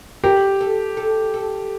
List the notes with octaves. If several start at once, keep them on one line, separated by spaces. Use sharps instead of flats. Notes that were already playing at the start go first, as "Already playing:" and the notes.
G4 A#4
A4
A4
A4